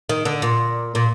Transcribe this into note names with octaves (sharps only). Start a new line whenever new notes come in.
D#3
D3
A#2
A#2